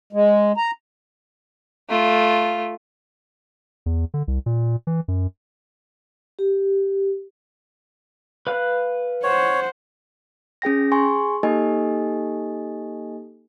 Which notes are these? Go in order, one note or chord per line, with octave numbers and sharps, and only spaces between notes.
G#3
A#5
A3 F4
E2
D3
C2
A#2
E3
F#2
G4
B4 F5 F#6
C5 C#5 F#5
C#4 G#4 G5 A#6
G#4 G#5 C6 C#6
A#3 D#4 G4 A4 D#5 G#5